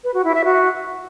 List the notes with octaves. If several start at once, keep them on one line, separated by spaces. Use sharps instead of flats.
B4
F#4
E4
E5
F#4